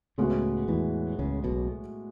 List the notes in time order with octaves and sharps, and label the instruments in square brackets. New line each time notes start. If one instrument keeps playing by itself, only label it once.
[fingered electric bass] C#2 C#3 [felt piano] A2 G#3 B3 F#4
[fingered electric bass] E2 E3
C#2 C#3
B1 B2